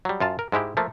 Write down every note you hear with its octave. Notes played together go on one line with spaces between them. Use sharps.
F#3 G3
F#2 F4 A5
A#4
G#2 G#3 E4 G4
F3 A3 A#3